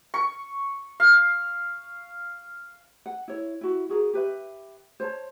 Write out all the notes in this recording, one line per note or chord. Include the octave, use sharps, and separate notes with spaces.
C#6
F5
F#5
E4 C#5
E4 F#4
F#4 G#4 A#4
G4 B4 E5
C5 C#5 A5